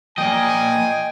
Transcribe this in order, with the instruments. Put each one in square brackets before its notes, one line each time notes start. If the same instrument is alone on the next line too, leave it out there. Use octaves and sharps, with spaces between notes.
[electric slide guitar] F3 A#3 D5 [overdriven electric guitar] D#5 [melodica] G5 [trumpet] G#5